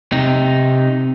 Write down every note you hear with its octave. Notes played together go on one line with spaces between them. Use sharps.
C3 D#4